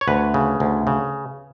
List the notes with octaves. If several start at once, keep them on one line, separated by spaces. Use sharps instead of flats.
C#5
D2 B4
C#3
D2
C#3